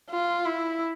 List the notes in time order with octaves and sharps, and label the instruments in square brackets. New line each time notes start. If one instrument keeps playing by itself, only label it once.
[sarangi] F4
E4